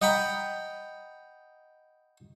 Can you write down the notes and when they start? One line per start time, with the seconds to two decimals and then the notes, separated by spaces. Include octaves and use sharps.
0.02 D#5 F#5 G5 A#5 B5